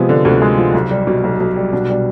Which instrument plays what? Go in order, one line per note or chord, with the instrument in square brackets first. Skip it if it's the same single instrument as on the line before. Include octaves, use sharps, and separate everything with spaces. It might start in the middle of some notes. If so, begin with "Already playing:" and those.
Already playing: [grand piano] C3 [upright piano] F3 G#3 B3
[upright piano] D3
[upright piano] D2 [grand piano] C3
[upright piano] G#3
F3
B1
G3
B2
B1
B1
G3
[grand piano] B2 [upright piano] D4
[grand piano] B2 [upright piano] G3